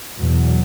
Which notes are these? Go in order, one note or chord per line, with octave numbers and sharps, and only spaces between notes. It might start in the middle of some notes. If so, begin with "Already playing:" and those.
E2 B2 F#3